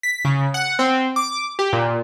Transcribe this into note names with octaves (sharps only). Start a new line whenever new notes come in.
B6
C#3
F#5
C4
D6
G4
A#2